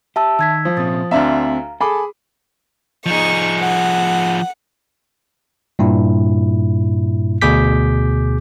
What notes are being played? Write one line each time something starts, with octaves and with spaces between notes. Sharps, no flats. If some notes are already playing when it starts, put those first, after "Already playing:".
G4 E5 A5 E6
D#3 E6 G#6 B6
F3
A#2 C4 C#4 D#6 A6
D2 C4 D4 E5 F5 A#5
G#4 A4 B5 D6
F3 D#4 G#4 C#6
F#5
G2 A#2 E4
D2 B2 G#4 D6 G6 B6